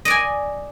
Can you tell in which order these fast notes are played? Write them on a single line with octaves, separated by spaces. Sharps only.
D#5 D5 G#5